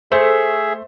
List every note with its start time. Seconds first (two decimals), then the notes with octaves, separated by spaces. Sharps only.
0.12 A3 G#4 C5 E5